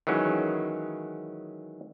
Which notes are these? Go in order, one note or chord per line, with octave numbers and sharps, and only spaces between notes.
D#3 E3 F#3 G#3 C#4